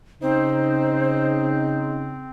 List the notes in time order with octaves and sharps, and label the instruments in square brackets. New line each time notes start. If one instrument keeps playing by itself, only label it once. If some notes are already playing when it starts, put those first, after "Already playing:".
[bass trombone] C#3 [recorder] C4 [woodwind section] D#4 [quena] C5